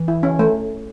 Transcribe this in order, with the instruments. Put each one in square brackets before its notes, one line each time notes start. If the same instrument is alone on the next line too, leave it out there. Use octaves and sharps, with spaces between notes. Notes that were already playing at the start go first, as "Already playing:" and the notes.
Already playing: [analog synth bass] E3
[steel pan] E4
C#4
A3